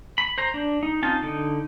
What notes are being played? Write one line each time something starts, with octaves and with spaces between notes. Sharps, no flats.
B5
C5 A#5
D4
D#4
C4 C#4 D#4 F4 A5
D3 D#4